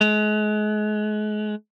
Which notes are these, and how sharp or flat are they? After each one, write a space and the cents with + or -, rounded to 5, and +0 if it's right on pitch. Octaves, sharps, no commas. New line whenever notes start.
G#3 +35